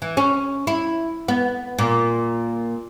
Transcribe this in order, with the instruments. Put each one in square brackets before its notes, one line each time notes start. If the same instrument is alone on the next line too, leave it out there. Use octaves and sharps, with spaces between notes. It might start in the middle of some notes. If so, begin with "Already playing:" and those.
[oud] E3
C#4
E4
B3
A#2